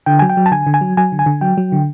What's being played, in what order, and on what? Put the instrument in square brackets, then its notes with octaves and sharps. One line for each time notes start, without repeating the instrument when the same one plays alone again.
[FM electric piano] D3 G5
F#3 G#5
G5
F#3
A5
D3 G#5
D3
G#5
F#3
F#3 G#5
D3
G#5
D3
F#3 G5
F#3
D3